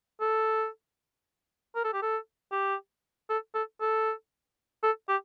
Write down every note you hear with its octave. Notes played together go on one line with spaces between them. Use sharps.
A4
A#4
A4
G4
A4
G4
A4
A4
A4
A4
G4